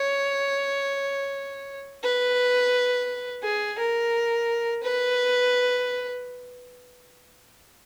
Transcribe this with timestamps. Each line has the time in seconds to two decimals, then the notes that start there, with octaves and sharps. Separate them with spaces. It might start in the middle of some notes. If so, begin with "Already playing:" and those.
Already playing: C#5
2.04 B4
3.43 G#4
3.79 A#4
4.83 B4